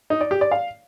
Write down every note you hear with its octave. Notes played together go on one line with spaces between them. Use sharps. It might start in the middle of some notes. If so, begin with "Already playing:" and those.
D#4
D5
G4
D5
F5